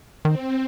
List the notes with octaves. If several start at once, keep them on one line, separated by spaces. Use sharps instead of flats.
D#3 C4